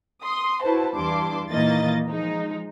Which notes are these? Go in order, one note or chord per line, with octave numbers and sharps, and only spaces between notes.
C6 D#6
E4 F#4 B4 C5 A5
E2 G2 E3 A5 C6 D6
A#2 D#3 E3 A#3 D#5 A6
F3 G#3 D#4